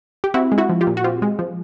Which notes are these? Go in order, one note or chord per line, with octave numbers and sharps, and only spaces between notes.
G4
C4 E4 F#4
G#3
E4 F#4
F3
F4 G4
A#2
F#4
C4 F4 G4
G#3
F3